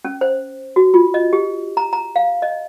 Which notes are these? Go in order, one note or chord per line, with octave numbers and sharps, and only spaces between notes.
C#4
C5
F#4
F4
D#5
G4
A#5
A#5
F5
D#5